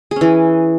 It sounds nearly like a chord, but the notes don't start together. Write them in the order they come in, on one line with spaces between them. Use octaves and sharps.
G#4 C#4 E3